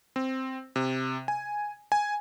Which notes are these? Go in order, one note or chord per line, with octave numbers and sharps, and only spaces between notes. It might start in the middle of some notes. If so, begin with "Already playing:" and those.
C4
C3
G#5
G#5